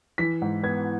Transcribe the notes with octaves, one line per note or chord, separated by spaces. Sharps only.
E3 B6
G#2
B3 G#6